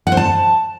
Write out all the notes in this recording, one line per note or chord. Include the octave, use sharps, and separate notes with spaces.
F#5
C5
A5